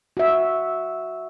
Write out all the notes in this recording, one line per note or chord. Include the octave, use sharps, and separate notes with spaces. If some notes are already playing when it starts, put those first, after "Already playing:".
F#4 E5